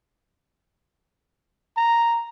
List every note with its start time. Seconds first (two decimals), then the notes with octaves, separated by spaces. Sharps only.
1.77 A#5